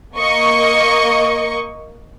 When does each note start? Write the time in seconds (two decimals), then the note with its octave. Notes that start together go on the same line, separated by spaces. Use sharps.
0.15 A#3 D#5 C#6